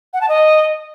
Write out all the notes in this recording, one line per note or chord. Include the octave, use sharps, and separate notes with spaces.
F#5
A5
D#5